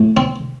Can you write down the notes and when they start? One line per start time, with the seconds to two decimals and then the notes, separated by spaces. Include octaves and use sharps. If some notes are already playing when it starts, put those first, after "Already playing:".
Already playing: A2
0.17 C4